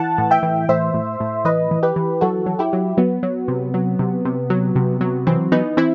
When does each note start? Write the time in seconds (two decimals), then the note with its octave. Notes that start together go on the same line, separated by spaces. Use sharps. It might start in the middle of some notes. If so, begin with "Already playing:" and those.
Already playing: E3 F#5 A5
0.18 A2
0.31 E5 G5
0.43 E3
0.69 A2 C5 E5
0.94 A2
1.20 A2
1.45 E3 B4 D#5
1.71 E3
1.83 G4 B4
1.96 E3
2.21 F#3 F#4 A4
2.46 F#3
2.59 E4 G4
2.73 F#3
2.97 F#3 B3
3.23 F#3
3.48 C3
3.74 F#3
3.99 C3
4.25 C3
4.50 F#3
4.76 C3
5.01 F#3
5.27 E3 C4
5.52 E3 B3 D#4
5.77 E3 C4 E4